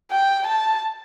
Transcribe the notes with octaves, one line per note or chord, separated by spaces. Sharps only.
G5
A5